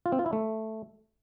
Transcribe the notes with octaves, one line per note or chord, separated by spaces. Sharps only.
F4
C4
F4
E4
A3